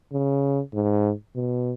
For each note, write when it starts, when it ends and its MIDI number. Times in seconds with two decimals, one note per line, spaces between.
0.12 0.60 49
0.74 1.11 44
1.36 1.74 47